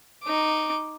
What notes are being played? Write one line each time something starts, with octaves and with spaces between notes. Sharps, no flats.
D#4 D6